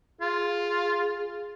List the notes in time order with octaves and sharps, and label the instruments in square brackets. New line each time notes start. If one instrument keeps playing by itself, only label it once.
[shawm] F4 [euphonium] G#4